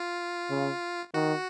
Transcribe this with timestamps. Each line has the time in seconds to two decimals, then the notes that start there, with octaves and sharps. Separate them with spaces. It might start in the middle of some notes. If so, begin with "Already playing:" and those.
Already playing: F4
0.51 C#3
1.14 D#3 F#4